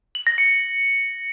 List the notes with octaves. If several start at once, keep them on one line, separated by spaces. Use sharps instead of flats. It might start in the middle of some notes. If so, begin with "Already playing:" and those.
F#7
A#6
C#7